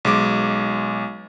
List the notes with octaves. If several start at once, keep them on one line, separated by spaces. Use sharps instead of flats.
B1 G#3 D6